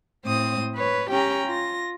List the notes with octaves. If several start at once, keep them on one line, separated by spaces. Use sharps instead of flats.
A2 C4 C5 D#6
B4 C#5
C#4 G4 G5 A#5
F4 A#6